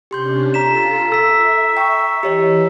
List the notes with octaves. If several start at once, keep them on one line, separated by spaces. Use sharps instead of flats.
C3 C#4 D4 G4 C6 G6
F4 A4 A#5 B6 E7
A4 E5 E6 B6
G5 C#6
E3 G4 C#5 D#5